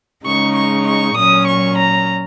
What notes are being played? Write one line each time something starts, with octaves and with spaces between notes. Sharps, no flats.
C#3 G#3 D#4 C#6
C#6
C#6
A#2 F#3 C#4 D#6
C#6
A#5